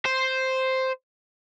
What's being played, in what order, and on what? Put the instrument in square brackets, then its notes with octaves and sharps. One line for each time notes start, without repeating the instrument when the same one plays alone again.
[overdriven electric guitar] C5